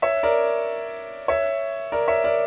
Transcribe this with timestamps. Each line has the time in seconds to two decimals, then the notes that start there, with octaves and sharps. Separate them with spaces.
0.02 C#5 E5
0.23 A#4 D5
1.28 C#5 E5
1.92 A#4 D5
2.08 C#5 E5
2.24 A#4 D5